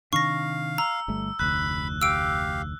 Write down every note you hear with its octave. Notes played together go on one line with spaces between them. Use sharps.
C3 D#3 D4 F5 C#6 A#6
A#5 E6
G1 G3 A3
F1 D2 B5 F#6
G4 F5 E6 D7